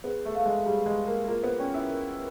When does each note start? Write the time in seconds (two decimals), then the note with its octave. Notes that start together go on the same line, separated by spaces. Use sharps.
0.04 B3 G#4
0.25 A3
0.35 A3 F5
0.46 G#3
0.66 G3 G#4
0.86 G#3
0.97 G#4
1.07 A#3
1.28 A#3 F4
1.43 B3
1.59 C#4 G5
1.74 E4
1.90 A#4